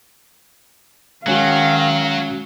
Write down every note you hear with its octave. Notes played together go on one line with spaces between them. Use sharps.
D#3 F#3 G#3 C#4 F#4 F5